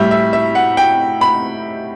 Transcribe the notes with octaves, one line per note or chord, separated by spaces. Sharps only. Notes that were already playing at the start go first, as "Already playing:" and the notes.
Already playing: A2 G3 E5
E5
E5
F#5
G5
B5